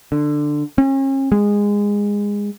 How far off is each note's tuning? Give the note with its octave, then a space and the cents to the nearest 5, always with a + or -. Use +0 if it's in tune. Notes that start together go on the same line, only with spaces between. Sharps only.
D3 +15
C#4 -40
G#3 -20